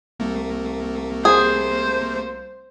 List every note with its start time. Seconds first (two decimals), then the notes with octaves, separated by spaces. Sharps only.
0.20 C2 A3 A#3
1.25 G#4 C5